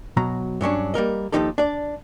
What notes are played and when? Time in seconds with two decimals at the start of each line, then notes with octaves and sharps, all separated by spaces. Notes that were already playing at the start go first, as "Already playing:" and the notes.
0.17 B2 F#3 A#5
0.61 G2 F#3 C#4 D4
0.94 G3 A#3 A#4 D#5
1.32 D#2 A#2 F3 D#4 G4 A4
1.58 D4 D5